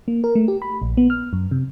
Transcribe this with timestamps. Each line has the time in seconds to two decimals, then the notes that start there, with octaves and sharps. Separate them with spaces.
0.08 A#3
0.24 A#4
0.35 A3
0.48 G4
0.62 B5
0.82 A#1
0.97 B3
1.10 F6
1.33 F#2
1.51 C3